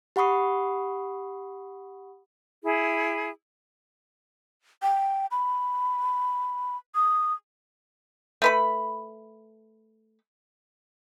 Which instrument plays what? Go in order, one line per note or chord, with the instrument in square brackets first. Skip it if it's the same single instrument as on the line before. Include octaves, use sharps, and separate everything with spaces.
[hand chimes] G4 F#5 B5 C#6 D#6 C7
[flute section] E4 G#4
[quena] G5
B5
D#6
[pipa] A3 B4 B5